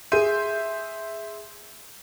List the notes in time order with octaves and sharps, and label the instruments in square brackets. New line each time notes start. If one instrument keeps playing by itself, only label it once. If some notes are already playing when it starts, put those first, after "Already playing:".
[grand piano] G#4 D#7 [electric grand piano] E5 C6 G6